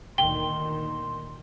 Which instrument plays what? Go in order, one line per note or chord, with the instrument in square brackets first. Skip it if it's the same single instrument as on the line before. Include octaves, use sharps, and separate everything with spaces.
[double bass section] D2 A#2 D#3 [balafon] G5 [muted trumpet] C6 [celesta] G7